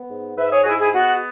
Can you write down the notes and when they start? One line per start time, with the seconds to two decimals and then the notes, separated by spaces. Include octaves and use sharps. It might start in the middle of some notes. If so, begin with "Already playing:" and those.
Already playing: B3
0.09 G#2
0.37 G#2 B4 E5
0.51 G#4 C#5
0.60 F#4
0.65 G#3 E4 G#4
0.79 E4 G#4
0.93 B3 F#4